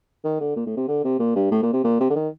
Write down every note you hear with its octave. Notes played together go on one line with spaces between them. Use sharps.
D#3
D3
A#2
A2
C3
D3
C3
A#2
G2
A2
A#2
C3
A#2
C3
D3
D#3